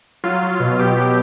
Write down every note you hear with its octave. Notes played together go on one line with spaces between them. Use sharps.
F#3 F4
F#3
B2
B2 G4
F#3